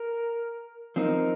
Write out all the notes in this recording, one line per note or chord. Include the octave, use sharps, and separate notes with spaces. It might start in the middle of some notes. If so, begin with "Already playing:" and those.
Already playing: A#4
F3 C4 D#4 A#4